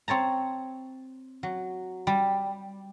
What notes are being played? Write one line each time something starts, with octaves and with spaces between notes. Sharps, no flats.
C4 C#5 A5 A#5
F#3
G3